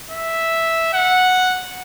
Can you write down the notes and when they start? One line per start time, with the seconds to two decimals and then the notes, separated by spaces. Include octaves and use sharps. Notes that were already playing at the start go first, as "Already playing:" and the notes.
0.10 E5
0.94 F#5